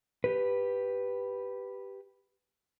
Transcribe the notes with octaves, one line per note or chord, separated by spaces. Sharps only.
G4 B4